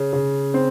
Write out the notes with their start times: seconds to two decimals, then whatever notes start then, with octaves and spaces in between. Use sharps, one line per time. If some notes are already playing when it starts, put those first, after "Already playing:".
Already playing: C#3
0.13 C#3
0.54 C4